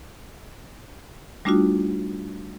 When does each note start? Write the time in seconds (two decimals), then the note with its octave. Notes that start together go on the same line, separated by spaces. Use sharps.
1.45 G3 A3 D4 D#4 F4 F#4